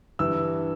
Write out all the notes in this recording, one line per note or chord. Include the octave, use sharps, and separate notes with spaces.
G2 E3 E6